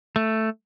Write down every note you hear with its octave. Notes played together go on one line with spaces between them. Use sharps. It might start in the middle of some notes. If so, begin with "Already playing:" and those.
A3